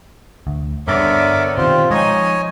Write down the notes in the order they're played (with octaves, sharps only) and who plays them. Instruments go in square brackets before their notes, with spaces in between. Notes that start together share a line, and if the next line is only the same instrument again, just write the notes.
[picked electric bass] D2
[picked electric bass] G2 [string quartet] D3 B3 C#5 [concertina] A#4 E5 D6
[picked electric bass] B2 D#3 [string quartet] C4 G4 [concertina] F4
[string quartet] F3 D#4 G#5 [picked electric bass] G#3 [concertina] C#5 D#5